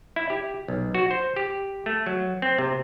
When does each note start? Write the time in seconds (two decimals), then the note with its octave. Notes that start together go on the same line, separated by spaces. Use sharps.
0.16 E4
0.30 G4
0.68 B1
0.94 F#4
1.11 C5
1.36 G4
1.86 A3
2.06 F#3
2.42 C4
2.59 C3